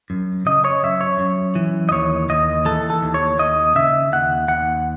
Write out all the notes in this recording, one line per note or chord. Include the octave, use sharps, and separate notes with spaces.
F#2
C#3 D#5
C#5
F#2 E5
C#5
F#2
E3
D#5
D#2 C#5
D#2 D#5
E3 A4
A4
D#2
C#5
D#2 D#5
C#3 E5
D#2 F#5
D#2 F#5